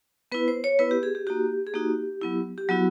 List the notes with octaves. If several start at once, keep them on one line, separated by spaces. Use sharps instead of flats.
B3 E4 B4
C5
C#5
B3 E4 B4
G4
G#4
G4
A#3 D#4 F#4 G4
G#4
A#3 D#4 F#4 G4
F#3 B3 E4
G4
F#3 B3 E4 F#4